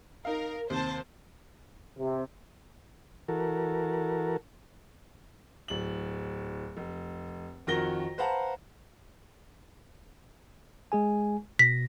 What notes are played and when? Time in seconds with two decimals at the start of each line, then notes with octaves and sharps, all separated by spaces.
0.25 D#4 A#4 F5
0.70 D#2 C3 C5 A5
1.99 C3
3.28 E3 F#4 A4 A#4
5.68 D1 F#7
6.77 F1
7.67 F2 D#3 F#4 A#4 A#6 G7
8.18 B4 C5 F5 F#5 A5 A#5
10.92 G#3 G#4 G#5
11.59 B2 A#6 B6